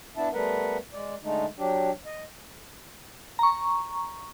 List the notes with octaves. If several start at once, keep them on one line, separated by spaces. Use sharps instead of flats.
B3 D4 E4 E5 A5
G3 A3 B3 A#4 B4 F#5
G#3 D5
D3 G#3 A3 D#4
F#3 D4 G4
D#5
A#5 C#6